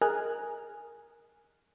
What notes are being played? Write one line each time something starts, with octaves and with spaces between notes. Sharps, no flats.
G#4 A#4 D#5 G#5 F6 F#6